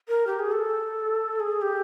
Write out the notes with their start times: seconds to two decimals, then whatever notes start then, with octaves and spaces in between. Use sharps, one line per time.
0.08 A#4
0.27 G4
0.39 G#4
0.51 A4
1.40 G#4
1.62 G4